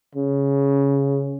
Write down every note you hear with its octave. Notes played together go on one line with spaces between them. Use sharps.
C#3